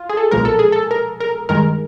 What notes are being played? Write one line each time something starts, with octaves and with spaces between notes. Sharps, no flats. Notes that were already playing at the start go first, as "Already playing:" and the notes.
Already playing: F4
G#4
A4
B1 A#2 F3 G#3 A#4
A4
G#4
A4
A#4
A#4
G2 D#3 G#3 A#4